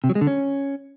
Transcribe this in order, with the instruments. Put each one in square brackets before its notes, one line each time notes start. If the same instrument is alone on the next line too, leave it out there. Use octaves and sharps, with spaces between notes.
[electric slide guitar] C3
F#3
G#3
D3
C#4